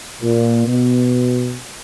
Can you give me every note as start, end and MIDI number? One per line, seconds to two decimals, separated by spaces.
0.21 0.66 46
0.66 1.56 47